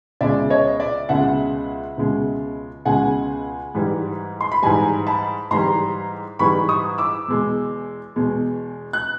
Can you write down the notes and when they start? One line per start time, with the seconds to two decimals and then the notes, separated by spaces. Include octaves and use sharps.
0.21 C#2 B2 G#3 D5 E5
0.50 C#5 D#5
0.80 D5 E5
1.09 C#2 B2 G#3 E5 F#5
1.98 C#2 B2 G#3
2.85 C#2 B2 G#3 F#5 G#5
3.74 G#2 E3 G3
4.41 C6
4.52 B5
4.62 G#2 E3 G3 G#5 A#5
5.07 A5 B5
5.51 G#2 E3 G3 A#5 C6
6.39 G#2 E3 G3 B5 C#6
6.69 C#6 D#6
6.98 D6 E6
7.28 E2 B2 G#3
8.16 E2 B2 G#3
8.93 F#6